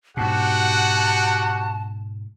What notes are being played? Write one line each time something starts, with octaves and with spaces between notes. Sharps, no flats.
G#2 B2 F#4 G4 F#5 A5